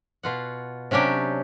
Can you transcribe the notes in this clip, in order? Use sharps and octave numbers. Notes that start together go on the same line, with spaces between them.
B2 F4 F#5
C3 F#3 C#4 D4 G4